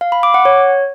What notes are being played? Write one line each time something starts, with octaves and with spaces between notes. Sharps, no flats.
F5
B5
D6
F#5
C#5